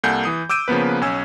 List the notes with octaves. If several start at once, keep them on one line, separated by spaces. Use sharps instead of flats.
C2 A#3 A4 F#5 G#5 G6
E3 D#6 G6
D6 E6 G6 D7 D#7
C#3 F3 A#3 B3 B4
B1 C#4 G#5 E6